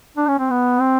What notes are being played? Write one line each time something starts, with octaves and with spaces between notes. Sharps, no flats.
D4
C#4
C4
B3
C4